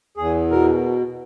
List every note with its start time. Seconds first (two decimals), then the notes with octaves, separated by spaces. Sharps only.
0.17 E2 G#4
0.51 B2 A#4